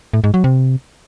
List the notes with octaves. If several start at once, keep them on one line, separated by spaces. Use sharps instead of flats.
A2
G#2
F#3
C3